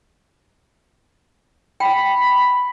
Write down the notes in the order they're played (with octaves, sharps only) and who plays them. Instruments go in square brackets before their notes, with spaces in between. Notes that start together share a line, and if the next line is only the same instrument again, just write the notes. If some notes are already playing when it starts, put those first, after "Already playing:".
[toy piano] G5 [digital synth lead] B5